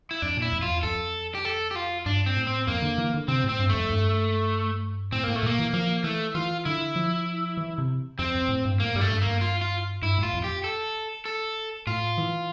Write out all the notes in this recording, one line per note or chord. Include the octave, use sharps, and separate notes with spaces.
E4
F2 D4
A#2 E4
F2
F4
E2
F2 A4
G4
A4
G4
F4
G2 D4
C4
A2
C4
F2 A#3
D3
E3
D3
C3 C4
A2
C4
G2
F2 A3
G2
A2 C4
A2 A#3
A3
A#2 A#3
E3
F3 A#3
E3 A3
E3 F4
D3 E4
F3
E3
C3
F2 C4
F2
A2
G2
A2 A#3
G2 G3
A3
G2
G2 A#3
F4
F4
G2 E4
A2 F4
F2
G4
A4
A4
A2 F4
E3